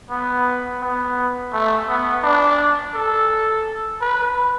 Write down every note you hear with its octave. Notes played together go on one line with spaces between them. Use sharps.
B3
B3
A3
B3
D4
A4
B4